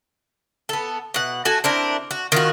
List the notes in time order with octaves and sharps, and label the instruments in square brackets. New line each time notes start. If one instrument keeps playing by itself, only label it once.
[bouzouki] B3 A4
B2 F#5
A3 F#4 G#5 A5
C4 D4 E4 A#4
F#4
D#3 F4 F#4